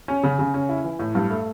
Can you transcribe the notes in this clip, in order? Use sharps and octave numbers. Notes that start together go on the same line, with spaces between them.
C#4
C#3
C#3
C#4
E4
E3
A2
G2
A3